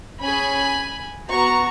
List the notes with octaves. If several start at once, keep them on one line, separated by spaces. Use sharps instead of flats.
C#4 G#4 G#5 B5
B3 F#4 A#5 C#6